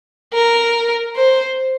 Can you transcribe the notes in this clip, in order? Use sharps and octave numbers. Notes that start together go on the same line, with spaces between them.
A#4
C5